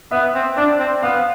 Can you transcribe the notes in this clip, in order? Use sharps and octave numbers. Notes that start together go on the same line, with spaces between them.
B3 E5
C4
D4 D5
C4
B3 F5